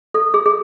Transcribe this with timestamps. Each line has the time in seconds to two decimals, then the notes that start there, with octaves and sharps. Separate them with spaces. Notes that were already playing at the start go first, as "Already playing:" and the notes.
0.14 A4
0.34 G#4
0.46 G#4